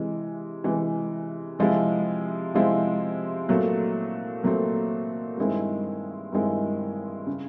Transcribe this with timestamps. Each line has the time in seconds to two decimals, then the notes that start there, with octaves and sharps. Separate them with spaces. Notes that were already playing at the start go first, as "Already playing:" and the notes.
Already playing: C3 E3 G#3
0.64 C3 E3 G#3
1.59 C3 F3 G#3 C4 E4
2.54 C3 F3 G#3 C4 E4
3.49 A#2 F#3 A3 C4
4.43 A#2 F#3 A3 C4
5.37 G2 D#3 G#3 C4 E4
6.32 G2 D#3 G#3 C4 E4
7.27 C#3